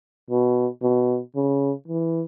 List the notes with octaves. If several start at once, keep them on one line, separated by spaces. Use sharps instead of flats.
B2
B2
C#3
E3